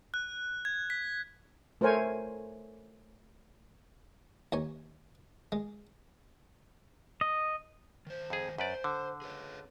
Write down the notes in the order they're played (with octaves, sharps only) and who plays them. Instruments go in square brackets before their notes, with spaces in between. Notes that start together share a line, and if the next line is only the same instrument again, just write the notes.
[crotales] F#6
G#6
B6
[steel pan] A3 A#4 C5 C#5 G#5
[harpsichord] D#2 C#5 G#5
G#3
[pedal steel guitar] D#5
[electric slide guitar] D#3 C5
[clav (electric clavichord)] F2 G#4
[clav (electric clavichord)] F#2 B4 D5 [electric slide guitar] C5
[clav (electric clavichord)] D3
[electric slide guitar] G#4 B4 C#5